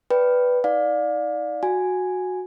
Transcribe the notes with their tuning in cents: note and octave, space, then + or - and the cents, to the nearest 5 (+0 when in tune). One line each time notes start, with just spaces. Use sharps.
B4 +0 D5 +0 G5 -10
D#4 +30 D5 +5 F5 +25
F#4 -10 G#5 +0